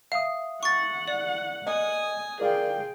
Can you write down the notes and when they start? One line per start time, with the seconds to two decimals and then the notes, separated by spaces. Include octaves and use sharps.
0.12 E5 F5 D#6
0.63 F#5 C#6 A6
1.08 D5
1.67 D#5 G#5 D#6
2.40 F4 G#4 A#4 D5 F5 G5